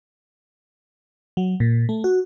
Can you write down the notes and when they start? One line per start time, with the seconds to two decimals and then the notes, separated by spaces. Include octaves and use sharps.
1.37 F#3
1.60 A#2
1.89 A3
2.04 F#4